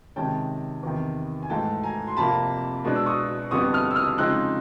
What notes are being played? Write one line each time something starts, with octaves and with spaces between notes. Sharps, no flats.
C3 D#3 G#3 C#4 G5 A5
E2 C3 D#3
G#5
G#2 E3 A3 G5 A5
G#5 A#5
C6
F2 C3 F3 A#3 A5 B5
B2 G#3 B3 D4
E6
C#6 D#6
F2 D3 G3 B3 C#6 D#6
D#6 F6
E6
D#6 F6
C#3 F3 G#3 C4 D#4 E6 F#6